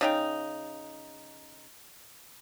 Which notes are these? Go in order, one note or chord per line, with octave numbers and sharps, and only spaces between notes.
C#3 D#4 G5